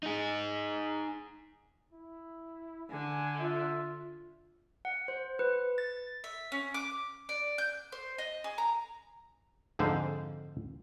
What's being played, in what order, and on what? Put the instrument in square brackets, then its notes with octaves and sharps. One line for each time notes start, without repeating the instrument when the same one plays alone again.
[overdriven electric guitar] D#4 G#4
[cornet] E4
[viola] D3 [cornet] G#5
[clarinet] F4 [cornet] E5
[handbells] F#5
C5
B4
A6
[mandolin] E5
C#4
D6
D5
G6
C5
D#5
G#4
A#5
[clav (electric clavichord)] F2 G#2 D3 F3 C5